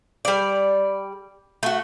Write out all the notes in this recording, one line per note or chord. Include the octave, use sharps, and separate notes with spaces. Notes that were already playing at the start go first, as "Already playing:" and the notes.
G3 D5
A3 F#4